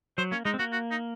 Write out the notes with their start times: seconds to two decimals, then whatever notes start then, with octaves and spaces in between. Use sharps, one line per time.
0.18 F#3 C5
0.32 A#3 C#4
0.45 G#3 D#4
0.54 C4
0.59 A#3 F#4
0.72 F#4
0.91 D#4